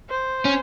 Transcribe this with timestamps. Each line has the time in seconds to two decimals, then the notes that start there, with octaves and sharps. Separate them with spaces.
0.10 C5
0.45 C#4